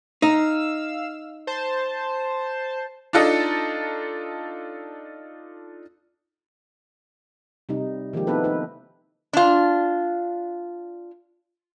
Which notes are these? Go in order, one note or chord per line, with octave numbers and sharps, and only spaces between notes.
D#4 F5 E6
C5 A5
D4 D#4 F4 A4 D#5
C3 G3 D#4
D#3 F3 G#3 A#3 G4
B3 C4 D#4 E4 A4 B4
D#4 B4
D4 F4